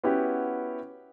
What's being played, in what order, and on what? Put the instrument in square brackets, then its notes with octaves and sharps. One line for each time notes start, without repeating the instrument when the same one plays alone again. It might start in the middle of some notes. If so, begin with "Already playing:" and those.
[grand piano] B3 C#4 E4 F#4 G4